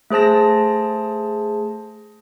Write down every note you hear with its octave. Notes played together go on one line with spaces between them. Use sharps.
A3 G#4 C5 A5 A#6